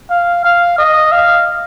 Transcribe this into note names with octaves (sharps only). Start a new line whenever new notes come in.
F5
F5
D#5
F5